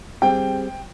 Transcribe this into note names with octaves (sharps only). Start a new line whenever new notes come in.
G3 C4 G#4 G5